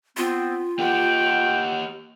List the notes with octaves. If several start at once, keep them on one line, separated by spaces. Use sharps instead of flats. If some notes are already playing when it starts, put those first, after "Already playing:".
B3 C4 F4
A#3 G4 F#5 G5